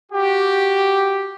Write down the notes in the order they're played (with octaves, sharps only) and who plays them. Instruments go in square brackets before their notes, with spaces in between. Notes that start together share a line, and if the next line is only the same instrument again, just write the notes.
[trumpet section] F#4 G4